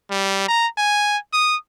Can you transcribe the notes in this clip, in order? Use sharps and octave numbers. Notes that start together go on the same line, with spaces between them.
G3
A#5
G#5
D#6